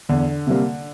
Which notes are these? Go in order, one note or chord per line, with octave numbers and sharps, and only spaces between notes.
E2 D3
C3 G3 A#3